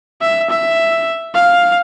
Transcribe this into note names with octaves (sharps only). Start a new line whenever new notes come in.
E5
E5
F5